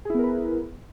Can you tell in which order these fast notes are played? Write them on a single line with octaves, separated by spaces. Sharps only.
G#4 E4 B3 A#4 B4